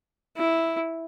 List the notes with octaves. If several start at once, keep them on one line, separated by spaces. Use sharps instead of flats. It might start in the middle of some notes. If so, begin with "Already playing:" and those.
E4